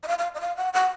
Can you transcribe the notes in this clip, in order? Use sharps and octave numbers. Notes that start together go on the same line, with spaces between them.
D#5
F5
F5
D#5
F5
F#5
F#5